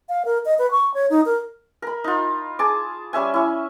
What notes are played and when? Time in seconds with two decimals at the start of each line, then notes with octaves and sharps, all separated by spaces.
0.09 F5
0.25 A#4
0.45 D#5
0.58 B4
0.71 C#6
0.94 C#5
1.10 D#4
1.26 A#4
1.82 A#4 B5
2.04 D#4 F4
2.59 G#4 A5 D6
3.13 G3 C#4 E5 G#5
3.34 C#4 E4